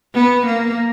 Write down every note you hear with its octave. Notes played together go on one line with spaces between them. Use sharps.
B3
A#3